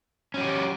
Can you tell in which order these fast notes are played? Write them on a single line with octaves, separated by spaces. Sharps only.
C#4 F#3 G4